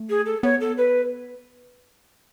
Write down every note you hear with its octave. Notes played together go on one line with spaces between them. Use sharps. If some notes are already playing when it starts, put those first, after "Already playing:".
Already playing: A3
G#4
A4
B3 C#5
A4
B4